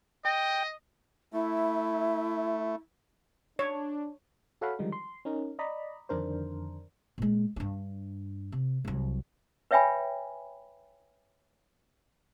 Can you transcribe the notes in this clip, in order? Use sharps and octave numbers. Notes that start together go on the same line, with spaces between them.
D#5 G5
A3 E4
D4 C#5
F#4 A4 C#5 F5 F#5 B5
D3 D#3 F3 G3 G#3 D#4
C6
C#4 D#4 A#4
D5 D#5 A#5 B5
F2 D3 D#3 D4 A#4 C5
A#2 G#3
G2 D4
C3
C2 F#3
B4 C#5 E5 G5 G#5 B5